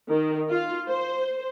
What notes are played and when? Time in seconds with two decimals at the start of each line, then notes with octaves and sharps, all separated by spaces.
0.11 D#3
0.50 F4
0.87 C5